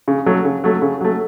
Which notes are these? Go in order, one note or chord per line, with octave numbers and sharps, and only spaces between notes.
C#3
F#3 A3
C#3
F#3 A3
C#3
F#3 A3